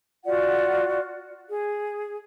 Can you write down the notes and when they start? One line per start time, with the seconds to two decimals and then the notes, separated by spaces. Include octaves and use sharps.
0.26 F4 F#4 D5 F#5
1.48 G#4